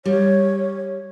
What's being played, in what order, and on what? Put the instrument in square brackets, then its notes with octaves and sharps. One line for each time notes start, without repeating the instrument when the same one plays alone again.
[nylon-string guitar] G3 [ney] C#5